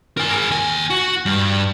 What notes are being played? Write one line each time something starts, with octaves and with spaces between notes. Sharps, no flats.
A#4 G#5
G#4 A#4
D#2 G#5
F#4
G2